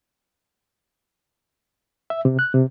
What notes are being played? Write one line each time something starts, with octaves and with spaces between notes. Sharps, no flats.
E5
C3
F#6
C3